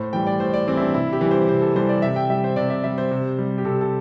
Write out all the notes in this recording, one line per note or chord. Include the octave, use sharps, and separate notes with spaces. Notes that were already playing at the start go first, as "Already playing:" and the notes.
Already playing: A2 C5
E3 G3 G5
D5
A2 C5
D5
E3 G3 C4
E4
D4
C3 E4
G4
E3 G3
C5
C3 C5
A4
E3 G3 C5
D5
C3 E5
G5
G3 E5
C5
C3 D5
E5
G3 E5
C5
C3
G3
G4
C3 A4
A4